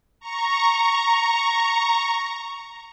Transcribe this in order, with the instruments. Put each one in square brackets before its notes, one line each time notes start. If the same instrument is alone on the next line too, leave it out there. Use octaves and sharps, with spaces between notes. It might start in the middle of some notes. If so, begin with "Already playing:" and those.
[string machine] A#5 C#6